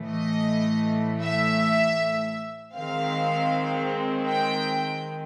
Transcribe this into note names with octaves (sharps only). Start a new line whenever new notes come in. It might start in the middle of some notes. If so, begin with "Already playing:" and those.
Already playing: A2 E3 A3
D#5
E5
D#3 G#3 C4 F5
G5